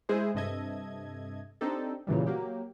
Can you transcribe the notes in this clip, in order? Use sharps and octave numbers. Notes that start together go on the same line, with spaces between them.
G#3 E4 G#4 C5
G2 C3 A4 D#5 E5 G#6
C4 D4 D#4 G4 A4
A#2 C#3 E3 G3
F#3 A#3 G4